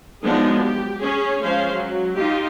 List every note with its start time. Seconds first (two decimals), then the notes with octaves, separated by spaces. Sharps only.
0.23 F3 F#3 G#3 B3 D4 D#4
0.62 G4
1.00 C#4 G#4 C#5
1.43 F3 G#3 C#4 C5 F5
1.73 F#3
2.15 D#4 F4 G4